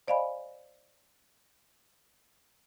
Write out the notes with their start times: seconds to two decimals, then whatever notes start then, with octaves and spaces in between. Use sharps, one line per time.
0.08 C5 D5 D#5 F5 G#5 B5